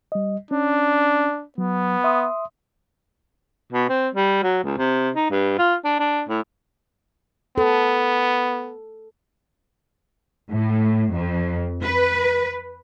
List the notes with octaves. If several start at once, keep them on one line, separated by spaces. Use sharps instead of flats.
G3 D#5
C#4 D4
F#3 B3
E5 C6 D#6
B2
C4
G3
F#3
C#2
C3
D#4
G2
F4
D4
D4
A2
B3 A4
A2
F2
B4